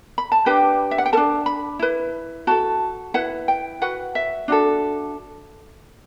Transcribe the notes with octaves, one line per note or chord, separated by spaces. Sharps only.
B5
A5
D4 G4 B4 G5
E5
F#5
G5
D4 A4 A5
B5
E4 B4
F#4 A4 A5
E4 B4 F#5
G5
F#4 B4 F#5
E5
D4 F#4 A4